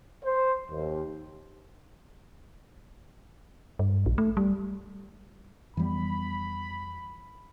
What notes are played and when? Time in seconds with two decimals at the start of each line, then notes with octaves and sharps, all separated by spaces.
0.24 C5
0.70 D#2
3.79 G2
4.06 A#1
4.18 A3
4.37 G3
5.77 F2 E3 G3 B3 B5